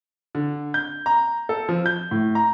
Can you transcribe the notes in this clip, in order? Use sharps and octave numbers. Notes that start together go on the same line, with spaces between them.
D3
G6
A#5
A4
F3
G6
A2
A#5